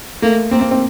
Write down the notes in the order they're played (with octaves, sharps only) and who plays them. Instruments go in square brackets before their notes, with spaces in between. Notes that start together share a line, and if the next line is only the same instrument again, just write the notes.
[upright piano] A3 [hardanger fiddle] A#3
[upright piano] A#3 [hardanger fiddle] C4
[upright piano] A#3
C4